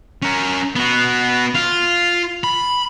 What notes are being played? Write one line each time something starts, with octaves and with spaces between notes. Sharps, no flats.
C#4 A#4
B3 F#4
F4
B5